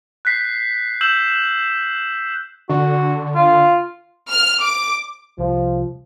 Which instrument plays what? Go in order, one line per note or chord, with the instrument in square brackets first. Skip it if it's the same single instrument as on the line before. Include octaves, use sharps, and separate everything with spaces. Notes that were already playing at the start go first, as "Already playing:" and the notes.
[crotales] F#6 G6 B6 C7
E6 G6 E7 F#7
[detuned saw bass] D3 [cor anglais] F#4
[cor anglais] F4
[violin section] F6
D6
[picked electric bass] C2 [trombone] F3